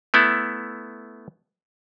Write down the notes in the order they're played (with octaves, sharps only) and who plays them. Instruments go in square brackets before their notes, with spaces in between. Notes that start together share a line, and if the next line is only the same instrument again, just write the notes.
[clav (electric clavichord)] A3 B3 E4